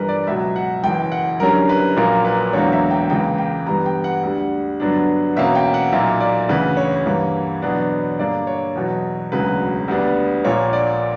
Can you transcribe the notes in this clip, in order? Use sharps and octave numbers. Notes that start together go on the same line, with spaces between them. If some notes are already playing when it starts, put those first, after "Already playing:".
Already playing: G1 G2 E3 G3 A#4 B4
D5
C#2 B2 F#3 E5
F#5
F#1 F#2 E3 G5
F#5
F#1 F#2 D3 G3 C#4 A#4
B4
A#1 A#2 F#3 A#3 A#4
B4
E1 E2 D3 F#3 A#3 C#5
E5
G5
C#2 C#3 E3 A#3 G5
G5
G2 E3 G3 B3 A#5
G5
F#5
D2 D3 G3
G2 D3 F#3 B3 D4
E2 B2 A#3 C#4 E5
G5
F#5
B1 A#2 A#3 E5
D5
D2 C#3 E3 B4
C#5
G2 E3 A#3
E2 B2 F#3 B3 D4
G2 D3 A#3 D4 D5
C#5
E2 B2 F#3
E1 D2 C#3 F#3 B4
D2 D3 G3 B3 D4
A#1 A#2 A#3 C#5
D5